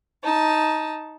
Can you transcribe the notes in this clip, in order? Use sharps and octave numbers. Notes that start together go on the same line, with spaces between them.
D#4 A5